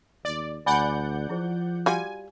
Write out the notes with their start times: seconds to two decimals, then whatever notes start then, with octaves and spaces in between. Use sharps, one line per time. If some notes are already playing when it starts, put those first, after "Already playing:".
0.25 D#2 D5
0.66 D2 D5 F#5 G#5 B5 G6
1.29 F3 E4 G#4 C5
1.86 G3 F4 F#4 G#5